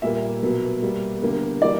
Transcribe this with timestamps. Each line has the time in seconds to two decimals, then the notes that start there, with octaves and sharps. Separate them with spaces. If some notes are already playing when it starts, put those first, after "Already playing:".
0.02 A#2 G3 A#3 E5
0.43 B2 F#3 A#3
0.82 B2 G3 A#3
1.22 E2 D3 G3 A#3
1.62 E3 G3 A#3 D5